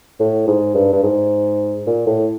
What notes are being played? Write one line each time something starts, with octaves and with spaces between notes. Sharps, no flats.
A2
G#2
G2
G2
G#2
A#2
A2